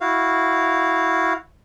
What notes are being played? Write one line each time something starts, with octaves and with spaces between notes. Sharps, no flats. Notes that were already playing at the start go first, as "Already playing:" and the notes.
E4 F#4 F5